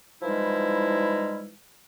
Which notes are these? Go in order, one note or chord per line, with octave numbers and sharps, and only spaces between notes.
E3 F3 G3 G#3 D#4 E4